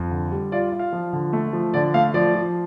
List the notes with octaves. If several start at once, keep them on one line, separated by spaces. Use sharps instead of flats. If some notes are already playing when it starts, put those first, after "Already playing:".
Already playing: F2
D3
G3
F4 D5
F4
F5
F3
D3
A3
F3
D3 D5
A3 F5
F3 D5
F3